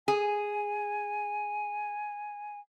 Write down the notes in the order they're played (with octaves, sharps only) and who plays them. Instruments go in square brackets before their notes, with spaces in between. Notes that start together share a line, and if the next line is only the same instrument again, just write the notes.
[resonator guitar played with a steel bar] G#4 [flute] G#5